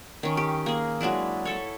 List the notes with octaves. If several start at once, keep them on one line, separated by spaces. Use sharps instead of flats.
D#3 C#4
G4
A#3 G#4
F#3 G#3 D4 E4
E4 A4 C#5